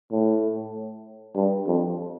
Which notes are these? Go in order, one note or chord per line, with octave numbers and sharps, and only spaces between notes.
A2
G2
F2